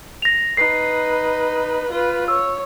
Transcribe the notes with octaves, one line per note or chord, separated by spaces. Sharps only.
A#6 F7
D#4 B4 C7
F4 B4
C#5 E6